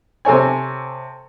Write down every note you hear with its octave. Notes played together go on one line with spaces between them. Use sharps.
C3 A4 C#5 G#5